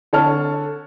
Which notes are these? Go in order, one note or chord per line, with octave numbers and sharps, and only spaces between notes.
D3 C#5 A5 F6